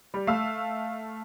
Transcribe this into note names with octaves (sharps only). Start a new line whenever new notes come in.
G3
A3 F5 E6